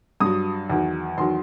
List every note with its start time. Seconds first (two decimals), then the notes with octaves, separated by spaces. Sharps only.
0.20 G2 F#3 D#6
0.70 E2 D#3 F#3
1.18 E2 D#3 F#3 C6